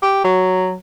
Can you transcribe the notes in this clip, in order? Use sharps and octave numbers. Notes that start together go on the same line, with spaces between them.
G4
F#3